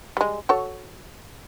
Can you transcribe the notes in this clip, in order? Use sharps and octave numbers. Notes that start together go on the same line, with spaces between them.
G3 G#3
F#4 A4 C#5